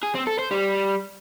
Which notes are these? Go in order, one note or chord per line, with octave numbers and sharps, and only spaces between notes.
G#4
C4
A4
C5
G3